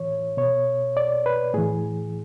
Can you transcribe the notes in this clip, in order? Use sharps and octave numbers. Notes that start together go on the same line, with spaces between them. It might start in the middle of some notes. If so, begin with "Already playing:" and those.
Already playing: A2 E3 C#5
B2 C#5
D5
B4
A2 E3 G#4